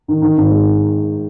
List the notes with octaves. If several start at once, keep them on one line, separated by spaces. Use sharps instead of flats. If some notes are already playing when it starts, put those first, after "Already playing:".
D#3
D#3
G#1
G#3